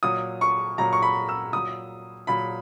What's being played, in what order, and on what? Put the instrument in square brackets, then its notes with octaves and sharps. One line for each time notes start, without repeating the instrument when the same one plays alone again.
[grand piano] A#2 F#3 D#6
C#6
A#2 F#3 A#5
C#6
B5
E6
A#2 F#3 D#6
A#2 F#3 B5